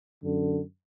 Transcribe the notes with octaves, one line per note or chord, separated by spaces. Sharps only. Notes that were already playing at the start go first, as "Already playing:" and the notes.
F#2 D3